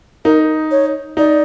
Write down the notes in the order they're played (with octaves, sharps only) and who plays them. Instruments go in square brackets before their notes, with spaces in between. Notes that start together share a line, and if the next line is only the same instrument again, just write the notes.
[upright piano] D#4 [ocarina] A#4
[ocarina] C#5
[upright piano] D#4 [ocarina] D5